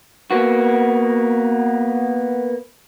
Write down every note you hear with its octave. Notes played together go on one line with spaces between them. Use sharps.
A#3 B3 F#4